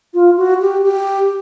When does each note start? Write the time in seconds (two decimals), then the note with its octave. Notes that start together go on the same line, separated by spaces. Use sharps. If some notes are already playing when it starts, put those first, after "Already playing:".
0.14 F4
0.37 F#4
0.61 G4
0.84 G4